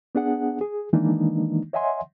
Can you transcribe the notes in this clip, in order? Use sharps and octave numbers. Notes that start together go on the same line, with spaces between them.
B3 D4 G#4 F#5
G#4
D#3 E3 G#3 A#3 D4 D#4
C#5 D#5 E5 F#5 G#5 C6